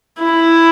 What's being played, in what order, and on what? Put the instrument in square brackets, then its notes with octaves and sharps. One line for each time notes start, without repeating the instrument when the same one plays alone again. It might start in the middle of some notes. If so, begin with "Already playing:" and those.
[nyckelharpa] E4